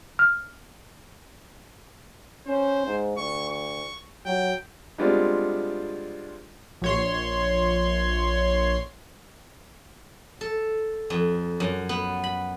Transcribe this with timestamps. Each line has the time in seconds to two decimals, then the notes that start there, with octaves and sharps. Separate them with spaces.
0.19 F6
2.47 C#4 C5
2.87 G#2
3.17 D2 C#6
3.49 C#6
4.26 F#3 G5
4.98 G3 G#3 B3 C4 D4 F4
6.82 A#1 C#5 C6
10.41 A4
11.10 F2
11.60 F#2
11.89 B3
12.24 B5